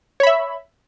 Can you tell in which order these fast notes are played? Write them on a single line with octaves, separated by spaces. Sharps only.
C#5 B5 E5